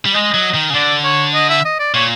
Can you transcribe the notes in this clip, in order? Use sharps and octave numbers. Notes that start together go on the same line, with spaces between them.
G3
G#3 D#5
F#3
D#3
C#3
D3 D5
C#5
D#5
E5
D#5
D5
A#2 C#5